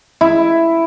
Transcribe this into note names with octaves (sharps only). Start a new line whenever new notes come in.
E4